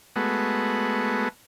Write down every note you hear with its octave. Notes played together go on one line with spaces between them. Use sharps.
G#3 A3 B3 F#4